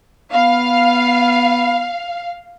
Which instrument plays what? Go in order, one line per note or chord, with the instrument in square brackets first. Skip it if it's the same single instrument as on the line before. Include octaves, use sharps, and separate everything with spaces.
[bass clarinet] B3 [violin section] F5